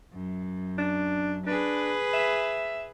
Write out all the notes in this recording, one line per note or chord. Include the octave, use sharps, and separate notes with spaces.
F#2
D4
D4 G#4 B4
E5